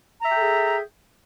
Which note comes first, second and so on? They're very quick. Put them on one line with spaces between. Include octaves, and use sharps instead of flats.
A#5 E5 G5 A4 G#4